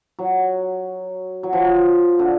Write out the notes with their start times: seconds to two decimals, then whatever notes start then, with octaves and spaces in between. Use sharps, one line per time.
0.19 F#3
1.43 F#3
1.53 F3
2.19 D3